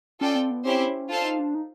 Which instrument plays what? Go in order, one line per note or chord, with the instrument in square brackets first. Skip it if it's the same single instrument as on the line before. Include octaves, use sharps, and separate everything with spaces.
[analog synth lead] C#4 [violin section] F4 A4 D5 G5
[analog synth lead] C4
B3
[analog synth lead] C4 [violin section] C#4 E4 G4 C5
[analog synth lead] C#4
[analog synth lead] D4 [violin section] F4 A4 C5 F5 A5
[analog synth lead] D#4
D4
D#4